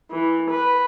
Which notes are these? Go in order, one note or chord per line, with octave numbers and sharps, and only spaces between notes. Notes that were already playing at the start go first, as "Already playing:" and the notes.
E3
B4